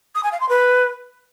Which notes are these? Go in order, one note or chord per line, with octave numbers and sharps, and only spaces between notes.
D#6
G#5
F5
C6
B4